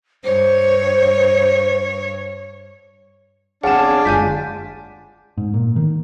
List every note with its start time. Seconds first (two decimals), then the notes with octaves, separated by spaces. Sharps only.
0.25 G2 C5 C#5
3.64 B3 C4 D4 G#4 C#5 F5 F#5 A5
4.05 F#1 D3 G#3 F4 G#5 G6 B6
5.38 G#2
5.54 A#2
5.76 D#3